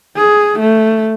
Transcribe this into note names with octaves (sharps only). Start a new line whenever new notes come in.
G#4
A3